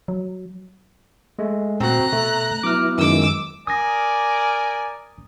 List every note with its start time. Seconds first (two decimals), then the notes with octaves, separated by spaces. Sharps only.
0.08 F#3
1.39 G#3 A3
1.80 A#2 C4 F#4 A#5 F#6
2.13 B2 A3
2.63 F#3 B3 E4 D6 F6
2.98 F#2 D#3 G#3 D6 E6
3.67 A#4 D5 G#5 D#6 A#6